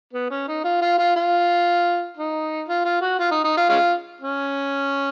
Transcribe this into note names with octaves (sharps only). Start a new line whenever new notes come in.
B3
C#4
D#4
F4
F4
F4
F4
D#4
F4
F4
F#4
F4
D#4
D#4
F4
G#3 C#4 F4
C#4